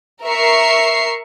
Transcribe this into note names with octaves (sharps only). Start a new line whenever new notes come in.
A#4 E5 C#6 C7